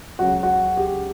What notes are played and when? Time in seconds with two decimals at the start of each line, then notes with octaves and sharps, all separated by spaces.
0.19 C#2 C#3 F#3 F#4
0.43 F#4
0.77 G4